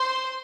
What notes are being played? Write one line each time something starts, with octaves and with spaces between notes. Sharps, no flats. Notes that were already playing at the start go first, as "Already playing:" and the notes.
Already playing: C5 C6